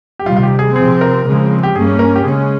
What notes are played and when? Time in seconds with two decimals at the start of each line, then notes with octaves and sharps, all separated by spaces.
0.19 G4
0.26 C3 D#3 G3 F4
0.37 F4
0.43 G4
0.59 G#4
0.76 C3 F3 C4 G#4
1.01 A#4
1.25 C#3 F3 G#3 C4
1.63 G4
1.75 G2 G3 A#3 C#4 G#4
1.99 A#4
2.15 G4
2.24 C#3 G#3 C#4 G#4